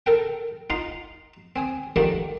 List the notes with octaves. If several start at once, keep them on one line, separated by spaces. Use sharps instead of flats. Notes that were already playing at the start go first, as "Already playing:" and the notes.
A4 A#4 G5
D#4 F4 D#5 A#5 C6
C4 G#5 D#6
D3 D#3 F3 G3 A3 D#4